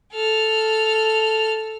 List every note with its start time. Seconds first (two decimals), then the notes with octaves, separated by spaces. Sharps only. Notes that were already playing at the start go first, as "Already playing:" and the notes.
0.13 A4 F6